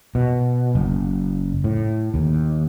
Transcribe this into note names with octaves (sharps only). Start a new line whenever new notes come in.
B2
F#1
A2
D#2